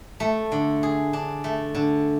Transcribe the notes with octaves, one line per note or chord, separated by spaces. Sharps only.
A3
D3
G#4
D4
A3
D3